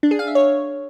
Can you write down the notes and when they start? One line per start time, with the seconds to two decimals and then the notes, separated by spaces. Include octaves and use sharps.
0.03 D4
0.11 G#4
0.19 F5
0.27 E5
0.35 C#5